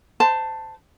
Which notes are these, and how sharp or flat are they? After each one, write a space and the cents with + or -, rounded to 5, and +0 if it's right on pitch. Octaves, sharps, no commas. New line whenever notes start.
C5 -20 A5 +10